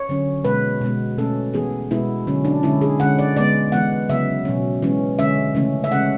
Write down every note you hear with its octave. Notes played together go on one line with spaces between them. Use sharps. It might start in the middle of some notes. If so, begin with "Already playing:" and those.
Already playing: C#5
D3 F#3 C#4
B2 G#3 B3 B4
B2 G#3 B3
B2 A3 C#4 A4
E3 B3 G#4
B2 G#3 B3 E4
D3 F#3 C#4
D4
D3 G#3 C#4 E4
G#4
D3 G#3 C#4 F#5
D5
D3 G#3 B3 D5
E3 G#3 B3 F#5
C#3 F#3 B3 E5
B2 F#3 C#4
E3 G#3 C#4
D3 G#3 C#4 E5
C#3 E3 A3 C#4
E5
C#3 G#3 C#4 F#5